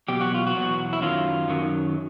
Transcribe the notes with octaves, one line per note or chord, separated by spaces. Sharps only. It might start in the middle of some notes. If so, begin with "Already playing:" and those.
E2 B2 F#3 G4
F#4
F4
F#4
E2 B2 F#3
E4
F#2 D#3 F#3 F4
F#2 D#3 F#3